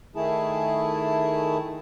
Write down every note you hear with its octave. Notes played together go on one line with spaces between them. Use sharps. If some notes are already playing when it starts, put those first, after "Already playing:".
D#3 A3 E4 G#4 A5